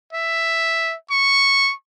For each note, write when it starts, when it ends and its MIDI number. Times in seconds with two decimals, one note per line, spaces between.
0.13 0.95 76
1.11 1.73 85